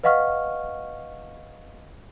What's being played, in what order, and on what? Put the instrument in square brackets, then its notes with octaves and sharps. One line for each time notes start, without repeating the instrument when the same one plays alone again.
[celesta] B4 D#5 F5 F#5 C#6 F6